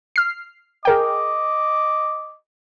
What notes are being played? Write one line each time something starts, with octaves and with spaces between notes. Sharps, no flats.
F6 C7
G#4 A#4 D#5 G5 D6